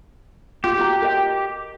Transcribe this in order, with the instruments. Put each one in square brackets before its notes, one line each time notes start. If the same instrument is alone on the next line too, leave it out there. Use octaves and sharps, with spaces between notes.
[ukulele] F4 [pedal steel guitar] G4
[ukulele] F4 F#4 A#5
A#4 D#5 G5